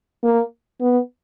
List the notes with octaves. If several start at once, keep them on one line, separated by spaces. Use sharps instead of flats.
A#3
B3